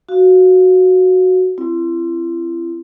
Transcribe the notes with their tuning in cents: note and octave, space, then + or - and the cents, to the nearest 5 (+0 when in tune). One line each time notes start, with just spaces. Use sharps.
F#4 +0 F5 +0
C4 +0 E4 +40